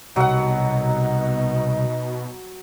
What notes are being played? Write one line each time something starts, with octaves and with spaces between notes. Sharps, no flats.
C2 B2 F#3 D#4 F#5